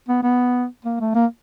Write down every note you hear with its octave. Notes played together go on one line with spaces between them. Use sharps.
B3
B3
A#3
A3
A#3